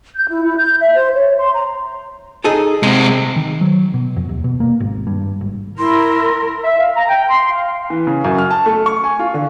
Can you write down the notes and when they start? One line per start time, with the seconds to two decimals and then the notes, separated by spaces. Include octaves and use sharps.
0.16 G6
0.28 E4
0.44 E4
0.57 G6
0.80 E5
0.95 C5
1.14 C#5
1.38 C6
1.53 A#5
2.44 D#4 G#4 A4
2.83 C3 G#3 C4
3.36 D#3
3.61 F#3
3.94 B2
4.16 F2
4.29 D#2
4.44 B2
4.60 A#3
4.80 G#1
5.07 G2
5.41 G#1
5.78 E4 A#4 C6
6.63 E5
6.79 F5
6.96 A#5
7.09 G5
7.29 C6
7.52 F5
7.90 E3
8.07 C#3
8.24 F#2
8.38 F6
8.51 A5
8.66 A3
8.86 C#6
9.04 G#5
9.19 F4
9.34 D3